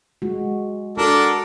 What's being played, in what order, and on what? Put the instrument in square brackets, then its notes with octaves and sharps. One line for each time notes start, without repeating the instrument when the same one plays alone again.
[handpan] G#3 F#4
[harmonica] D4 A4 A#4 [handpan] F#4